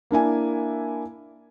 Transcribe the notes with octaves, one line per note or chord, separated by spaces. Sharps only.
A#3 D4 E4 G#5